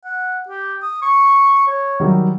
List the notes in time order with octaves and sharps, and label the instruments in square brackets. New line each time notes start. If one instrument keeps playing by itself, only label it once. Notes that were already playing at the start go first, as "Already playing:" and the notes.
[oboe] F#5
G4
D#6
C#6
C#5
[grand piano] D#3 F#3 G3